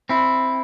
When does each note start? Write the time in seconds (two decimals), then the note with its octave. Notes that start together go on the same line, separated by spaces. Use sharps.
0.09 C4 E4